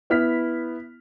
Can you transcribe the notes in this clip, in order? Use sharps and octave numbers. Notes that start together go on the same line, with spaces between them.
B3 E4 F6 B6